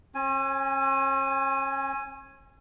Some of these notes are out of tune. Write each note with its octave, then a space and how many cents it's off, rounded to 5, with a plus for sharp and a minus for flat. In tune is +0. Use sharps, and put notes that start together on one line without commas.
C#4 -40 G#5 +0